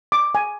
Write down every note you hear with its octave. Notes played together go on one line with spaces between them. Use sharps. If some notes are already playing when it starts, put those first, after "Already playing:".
D6
G#5